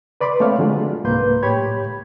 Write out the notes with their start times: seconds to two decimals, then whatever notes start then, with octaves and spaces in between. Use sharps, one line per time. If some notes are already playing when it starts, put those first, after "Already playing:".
0.21 B4 D5 B5 C6 D6
0.40 A3 C4 C#5 F5
0.58 D3 F#3 G#3 F4
1.04 C2 G#2 A#3 B4 C6 G6
1.43 A2 G4 C#5 B5 G#6